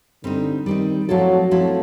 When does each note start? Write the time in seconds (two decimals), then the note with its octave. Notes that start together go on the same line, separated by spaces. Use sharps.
0.23 D3 G3 C4 D#4
0.66 D#3 G3 C4 D#4
1.09 F3 F#3 A3 C4 E4 A4
1.51 F3 F#3 A3 C4 E4 A4